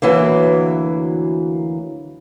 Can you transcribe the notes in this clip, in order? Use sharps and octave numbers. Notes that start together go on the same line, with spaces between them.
D2 E3 F#3 A#3